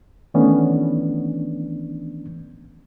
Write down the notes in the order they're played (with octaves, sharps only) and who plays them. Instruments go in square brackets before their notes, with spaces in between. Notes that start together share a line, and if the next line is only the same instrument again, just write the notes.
[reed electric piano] D#3 E3 A3 B3 C#4 D4